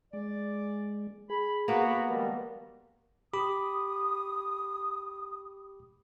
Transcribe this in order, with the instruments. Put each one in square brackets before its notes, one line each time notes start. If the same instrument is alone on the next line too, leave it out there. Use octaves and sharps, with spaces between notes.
[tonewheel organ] G#3 [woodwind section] D5
[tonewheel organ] G#4 [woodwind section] B5
[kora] A#3 B3 [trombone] F#4 [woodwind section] A#5 B5
[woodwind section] D#3 F3 G#3 [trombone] G3 [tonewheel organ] A#4
[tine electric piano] G4 B5 D6 [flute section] D#6